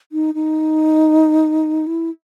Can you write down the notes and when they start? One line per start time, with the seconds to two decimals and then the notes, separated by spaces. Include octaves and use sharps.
0.12 D#4
0.35 D#4
1.87 E4